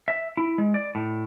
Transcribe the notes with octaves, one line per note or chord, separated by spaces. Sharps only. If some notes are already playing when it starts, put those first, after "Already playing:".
E5
E4
G#3
D5
A2